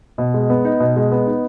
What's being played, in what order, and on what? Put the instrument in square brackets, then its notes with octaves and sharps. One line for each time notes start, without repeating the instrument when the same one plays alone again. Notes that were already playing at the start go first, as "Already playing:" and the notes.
[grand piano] B2
G#3
B3
D#4
B2
G#3
B3
D#4